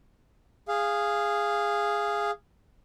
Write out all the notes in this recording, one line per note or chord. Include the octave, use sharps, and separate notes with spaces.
G#4 F5